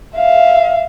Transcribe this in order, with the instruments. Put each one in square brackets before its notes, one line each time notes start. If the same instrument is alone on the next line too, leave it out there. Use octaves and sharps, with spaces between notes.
[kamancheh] E5 F5